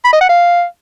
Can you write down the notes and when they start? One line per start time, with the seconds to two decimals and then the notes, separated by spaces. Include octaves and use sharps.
0.05 B5
0.13 D#5
0.21 F#5
0.29 F5